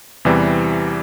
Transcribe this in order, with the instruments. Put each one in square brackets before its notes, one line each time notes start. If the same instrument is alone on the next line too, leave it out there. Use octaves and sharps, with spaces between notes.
[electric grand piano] E2 C3 E3 G3